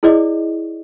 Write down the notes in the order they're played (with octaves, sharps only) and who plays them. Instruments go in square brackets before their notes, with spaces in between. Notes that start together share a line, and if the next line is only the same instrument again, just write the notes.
[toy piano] E4 G#4 C5 D5 D#5 D6